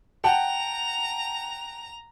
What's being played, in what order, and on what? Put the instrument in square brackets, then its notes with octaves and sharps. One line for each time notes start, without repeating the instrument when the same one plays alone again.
[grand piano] F#5 G5 A5 [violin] A#5 F7